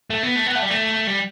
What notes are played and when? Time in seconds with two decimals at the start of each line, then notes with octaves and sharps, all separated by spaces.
0.10 A3
0.23 B3
0.36 A3
0.46 B3
0.55 A3
0.62 G3
0.70 A3
1.07 G3